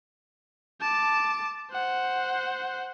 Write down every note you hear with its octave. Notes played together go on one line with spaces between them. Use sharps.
A5 D6
C5 F#5